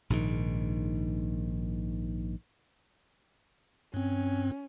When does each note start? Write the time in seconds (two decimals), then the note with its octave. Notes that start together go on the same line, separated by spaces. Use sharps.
0.10 A#1 G#2 D3 D#3
3.94 G2 C4 C#4